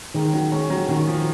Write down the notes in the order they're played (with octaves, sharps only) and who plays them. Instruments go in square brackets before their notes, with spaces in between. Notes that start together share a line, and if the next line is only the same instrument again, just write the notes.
[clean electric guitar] D#3 [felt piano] G#3
[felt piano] F#3
[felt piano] G#3 [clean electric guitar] C#4
[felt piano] F#3
[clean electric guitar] D#3 [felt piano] F#3
[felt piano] F3